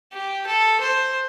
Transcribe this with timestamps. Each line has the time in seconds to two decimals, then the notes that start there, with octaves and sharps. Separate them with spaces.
0.13 G4
0.47 A4
0.80 C5